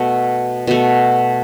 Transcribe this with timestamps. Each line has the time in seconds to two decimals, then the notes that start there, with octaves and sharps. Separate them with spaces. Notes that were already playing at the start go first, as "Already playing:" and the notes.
Already playing: B2 A3
0.67 B2 A3